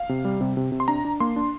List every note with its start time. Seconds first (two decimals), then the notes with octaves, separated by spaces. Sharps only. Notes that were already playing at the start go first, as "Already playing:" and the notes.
Already playing: F5
0.09 C3
0.25 G3
0.41 C3
0.57 C3
0.72 C3
0.80 C6
0.88 D4 A#5
1.05 D4
1.20 A#3 C6
1.36 D4